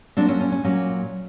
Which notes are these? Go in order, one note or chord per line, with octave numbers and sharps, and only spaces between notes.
A#2 F#3 A#3 C4 D4
C#4
C#4
C#4
A#2 F#3 A#3 C#4